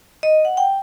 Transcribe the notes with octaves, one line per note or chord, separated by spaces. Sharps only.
D#5
F#5
G5